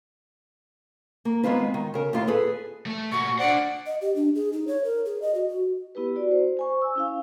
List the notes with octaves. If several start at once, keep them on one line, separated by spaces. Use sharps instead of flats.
A#3
D#3 G#3 B3 C4 F4 B4
D#3
C#3 A#4
D#2 A2 F4 F5
G#4 A4 B4
A3
A#2 F#4 C#6
D4 C5 D5 F#5
D#5
G4
D4
G#4
D#4
C#5
A#4
G#4
D#5
F#4
F#4
B3 E4 G4 B4
F#4 D5
C5
C5 G#5 C#6
E6
C#4 E4 F5